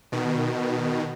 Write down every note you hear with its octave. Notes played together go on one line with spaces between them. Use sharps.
B2 D#3